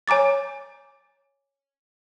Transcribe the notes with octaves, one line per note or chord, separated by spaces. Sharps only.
C#5 G#5 A#5 D6 A6